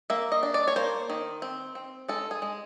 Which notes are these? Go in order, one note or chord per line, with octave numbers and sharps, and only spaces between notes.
A#3 E5
D#5
D4
D5
C#5
A#3 C5
D#3
C4
C4
G#3 A4
G#4
G#3